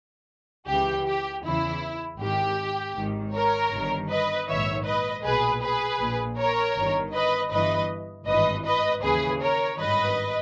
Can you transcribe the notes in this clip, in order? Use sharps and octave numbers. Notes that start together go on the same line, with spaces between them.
C#2 C#3 E3 G4
G4
E2 C#3 E3 E4
G#1 G#2 D#3 G4
G#1 G#2 D#3
A#4 C#5
G1 G2 D#3
B4 D#5
A#1 G#2 D#3 C#5 E5
B4 D#5
B1 A#2 G#4 B4
G#4 B4
A#1 A#2
A#4 C#5
G1 G2 D#3
B4 D#5
G1 G2 E3 B4 D#5
G#1 G2 E3 B4 D#5
B4 D#5
D#2 C#3 E3 G#4 B4
A#4 C#5
G#1 G2 D#3 B4 D#5